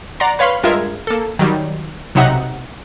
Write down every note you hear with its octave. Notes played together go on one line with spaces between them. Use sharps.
D5 F#5 A#5 C6
B4 C#5 F5 B5 C6 F6
G2 G#3 F4 A#4 E5 G#6
A#3 A4
D#3 F#3 G3
B1 C3 F#3 D#4 E5 F#5